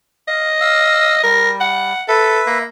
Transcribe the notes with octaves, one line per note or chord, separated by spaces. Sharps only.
D#5 F5
F5 E6
G3 A#4
F#5
A4 B4 E5
A#3